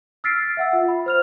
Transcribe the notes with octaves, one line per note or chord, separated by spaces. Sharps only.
E6 F6 A6 B6 C7 D7
A6
E5 F#5 E6
F4
B5
C5 F6 F7